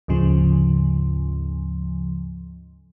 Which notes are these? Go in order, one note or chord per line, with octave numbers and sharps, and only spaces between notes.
D2 G#2 C#3 F3